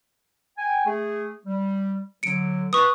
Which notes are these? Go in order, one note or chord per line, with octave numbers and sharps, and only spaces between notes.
G5 G#5
A3 G#4
G3
D3 F#3 C#7 D7
B4 C#6 D#6